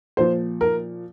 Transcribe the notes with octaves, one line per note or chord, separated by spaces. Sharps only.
A#2 F3 C5
A#4